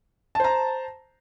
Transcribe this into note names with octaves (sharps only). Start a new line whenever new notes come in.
C5 A5 A#5